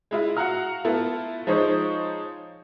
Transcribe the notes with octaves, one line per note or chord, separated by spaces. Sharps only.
G#3 E4 F4
F#4 F5 F#5 A#5 F6
A3 B3 E4 F4 A4
F3 G#3 D#4 C5 C#5